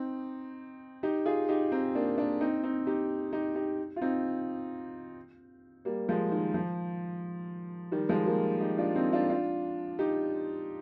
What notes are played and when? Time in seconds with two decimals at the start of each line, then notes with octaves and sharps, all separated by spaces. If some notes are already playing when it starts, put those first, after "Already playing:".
Already playing: C4 D#4
1.03 D#4 G4
1.25 F4 G#4
1.49 D#4 G4
1.72 C4 D#4
1.95 A#3 D4
2.18 A#3 D4
2.41 C4 D#4
2.63 C4 D#4
2.87 D#4 G4
3.33 D#4 G4
3.55 D#4 G4
3.96 F4
4.02 C4 D#4
5.85 G3 A#3
6.08 F3 G#3
6.31 D#3
6.54 F3
7.92 D#3 G3
8.09 F3 G#3
8.27 G3 A#3
8.61 D#4 G4
8.78 D4 F4
8.96 C4 D#4
9.12 D4 F4
9.30 D4 F4
9.99 D#4 G4